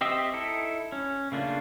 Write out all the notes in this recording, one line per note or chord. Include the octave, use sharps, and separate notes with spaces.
C4 G4 C5 D#5 E5
D#4 E4 A4
C#4
C#3 A3 A#3 D4 F4